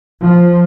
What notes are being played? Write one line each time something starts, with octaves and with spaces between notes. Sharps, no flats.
F3